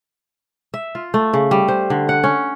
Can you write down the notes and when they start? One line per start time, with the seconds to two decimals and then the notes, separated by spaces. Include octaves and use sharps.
0.74 E5
0.95 F4
1.14 A3
1.34 C#3
1.51 G3
1.68 C5
1.90 D3
2.09 F#5
2.24 C#4